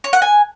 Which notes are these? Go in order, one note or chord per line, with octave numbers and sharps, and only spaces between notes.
C#5
F#5
G#5